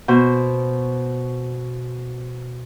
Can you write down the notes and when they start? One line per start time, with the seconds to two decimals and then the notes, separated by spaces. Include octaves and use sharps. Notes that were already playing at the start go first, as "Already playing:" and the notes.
0.08 B2 C5